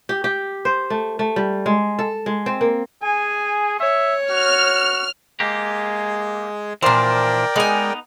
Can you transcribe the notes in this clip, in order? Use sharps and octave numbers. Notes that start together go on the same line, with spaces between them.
G4
G4
C5
A3
A3
G3
G#3
A4
G#3
C4
A#3
G#4 G#5
C#5 E5
F#4 F6
G#3 A#3 G4 G#4
A#2 E3 F3 D4 A#4 C5 D5 G5
G#3 B3 D#4 G#5